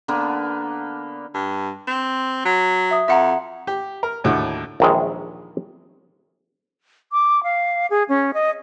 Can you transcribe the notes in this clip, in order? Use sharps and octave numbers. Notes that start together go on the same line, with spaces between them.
D3 A#3 B3 D4
G2
C4 E7
F#3
E5 D#6
F2 E5 F#5 A#5
G4
A#4
D#2 A2 D3 F#4
A#1 D#2 D#3 E3 G#3
D6
F5
G#4
C#4
D#5